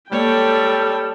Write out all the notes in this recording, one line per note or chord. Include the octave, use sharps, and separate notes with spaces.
G3 G#3 A#3 A4 C#5 D5 G5